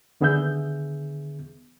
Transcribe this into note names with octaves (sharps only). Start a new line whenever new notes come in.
D#2 D3 B3 G#4 E5 G6